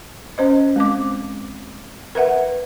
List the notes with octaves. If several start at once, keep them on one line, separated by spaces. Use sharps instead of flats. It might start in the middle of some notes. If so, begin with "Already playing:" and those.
C#4 C5 D#5
G#3 C4 D6
A#4 B4 E5 F#5